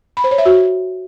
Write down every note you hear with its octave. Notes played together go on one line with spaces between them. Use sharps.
B5
C5
C#5
E5
F#4